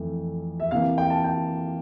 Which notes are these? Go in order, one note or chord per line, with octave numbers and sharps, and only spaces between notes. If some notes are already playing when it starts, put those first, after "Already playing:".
Already playing: F2 E3 A3
E5
C3 E3 A#3 F5
G5
A5
G5